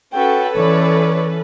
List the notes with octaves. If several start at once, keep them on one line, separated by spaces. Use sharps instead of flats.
C#4 F#4 A4 B4 G5
E3 C#5 D5